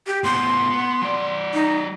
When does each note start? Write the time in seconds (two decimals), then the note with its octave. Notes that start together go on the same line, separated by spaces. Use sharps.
0.07 G4
0.24 A2 B3 C6
0.70 B3
1.02 F#3 D5
1.53 D#4